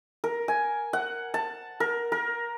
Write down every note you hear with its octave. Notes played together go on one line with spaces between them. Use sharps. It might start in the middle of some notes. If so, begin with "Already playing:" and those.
A#4
G#5
F#5
A5
A#4
A#4